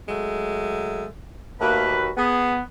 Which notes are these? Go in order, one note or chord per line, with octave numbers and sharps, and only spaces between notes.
F#3 G#3 A3
D#2 A3 A#3 F#4 B4
B3 G#4